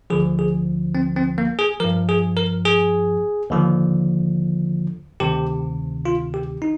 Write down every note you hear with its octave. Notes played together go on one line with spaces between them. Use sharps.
D2 D3 F3 G#4
G#4
C4
C4
A#3
G#4
G2 F3 A#4
G#4
A#4
G#4
D#2 D3 F3
D2 C3 D#3 G4
F4
G4
D#4